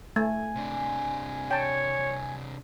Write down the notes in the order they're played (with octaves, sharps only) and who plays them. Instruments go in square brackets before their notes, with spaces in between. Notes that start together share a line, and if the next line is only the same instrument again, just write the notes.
[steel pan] A3 [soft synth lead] G#5
[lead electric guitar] C3 D4
[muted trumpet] C#5 [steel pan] G5 A5